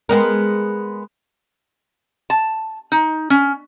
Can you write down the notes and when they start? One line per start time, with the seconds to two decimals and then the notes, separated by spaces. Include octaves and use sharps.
0.09 G#3 B3 A#4
2.30 A5
2.92 D#4
3.30 C#4